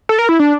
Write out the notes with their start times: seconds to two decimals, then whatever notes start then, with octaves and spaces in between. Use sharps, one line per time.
0.09 A4
0.19 A#4
0.29 E4
0.39 D4